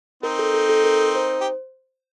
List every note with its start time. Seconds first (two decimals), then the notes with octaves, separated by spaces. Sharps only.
0.23 C4 D#4 A#4
0.39 A4
0.54 A4
0.69 A4
0.84 A#4
1.15 C5
1.41 G4